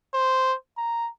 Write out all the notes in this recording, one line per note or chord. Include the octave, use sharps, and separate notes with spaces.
C5
A#5